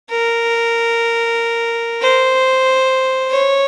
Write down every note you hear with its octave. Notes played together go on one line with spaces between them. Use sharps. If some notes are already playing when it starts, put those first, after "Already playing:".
A#4
C5
C#5